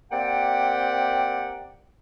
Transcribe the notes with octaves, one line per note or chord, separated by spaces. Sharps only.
A#3 C4 G4 D5 F#5 G5